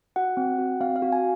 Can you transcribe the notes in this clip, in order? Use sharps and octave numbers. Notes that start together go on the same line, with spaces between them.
F#4 F#5
C4
F#4
C4 F5
F5
F#4
G#5